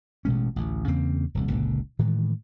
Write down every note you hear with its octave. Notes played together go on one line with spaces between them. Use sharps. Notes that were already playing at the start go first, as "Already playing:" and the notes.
A1 B2 G#3 C#4
A1 D2
E2 C#3 A#3 C4
D#1 C2 D3
F#1 C#2 A#2 D3
A2 D#3 E3 G#3